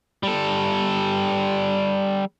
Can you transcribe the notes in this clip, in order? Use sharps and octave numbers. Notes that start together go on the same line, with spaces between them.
G3 A4